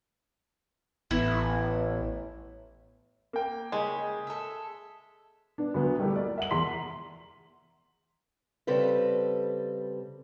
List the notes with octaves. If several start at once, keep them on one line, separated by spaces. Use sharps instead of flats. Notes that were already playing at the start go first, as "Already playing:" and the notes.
A1 B3 E4
A#3 G5
C#3 G#3
A4 E5
B3 D4
D2 F#3 B3
G3 A3 A#3 E4 G4
A#4 D5
E5 F#5 F#7
E2 A#5 C6 B6
C#3 G3 C4 A4 B4